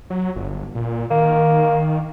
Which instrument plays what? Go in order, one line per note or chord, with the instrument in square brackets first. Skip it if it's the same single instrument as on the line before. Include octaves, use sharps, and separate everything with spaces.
[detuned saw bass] F#3
G1
A#2
[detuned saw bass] D#3 [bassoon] A#3